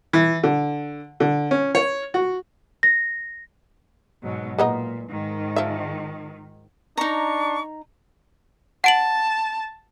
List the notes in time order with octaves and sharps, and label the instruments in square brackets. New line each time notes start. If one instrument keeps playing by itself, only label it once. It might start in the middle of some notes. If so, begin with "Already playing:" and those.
[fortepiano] E3
D3
D3
C#4
C#5
F#4
[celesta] A#6
[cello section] G#2 B2 F#3
[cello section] A#2 [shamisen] G#3 B3 D#4
[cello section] G#2 D#3
[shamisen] F3 E5
[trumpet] D4 [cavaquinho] D#4 A#5 [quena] C#6
[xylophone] F#5 D7 F#7 [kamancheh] A5